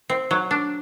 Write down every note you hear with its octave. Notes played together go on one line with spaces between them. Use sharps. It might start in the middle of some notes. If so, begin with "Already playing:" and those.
C4
F#3
D4